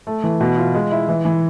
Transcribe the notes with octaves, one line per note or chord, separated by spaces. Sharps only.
A3
E3
B2
F4
G#3
E4
E3
E3